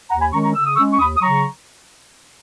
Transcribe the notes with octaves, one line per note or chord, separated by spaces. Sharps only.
D#2 F#5 A#5
G#5 B5
D#3 G#3 C#4 A#5 C#6
A#5 C#6
C#3 E6
D#6
G#3 C#4 C#6 E6
C#6
D#2 B5 D#6
D#6
C#3 F#3 A#5 C#6